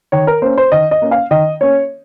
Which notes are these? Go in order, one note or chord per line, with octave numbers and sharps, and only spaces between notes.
D#3 C#5
A#4
A#3 C#4 C5
C5
D#3 D#5
D#5
A#3 C#4
F5
D#3 D#5
A#3 C#4 C#5